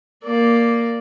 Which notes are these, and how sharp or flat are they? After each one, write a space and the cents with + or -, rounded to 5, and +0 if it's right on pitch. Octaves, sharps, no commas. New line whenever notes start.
A#3 +0 D5 -5